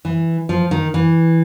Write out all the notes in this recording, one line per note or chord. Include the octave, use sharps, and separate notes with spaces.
E3
F3
D#3
E3